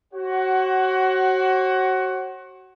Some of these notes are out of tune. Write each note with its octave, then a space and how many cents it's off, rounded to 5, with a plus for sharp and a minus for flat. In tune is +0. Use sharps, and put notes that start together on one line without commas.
F#4 +25 C#5 -45 F#5 +15